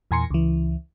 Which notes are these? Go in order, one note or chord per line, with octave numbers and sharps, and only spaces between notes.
E2 A#2 G#5 A#5 C6 C#7
C#2 E3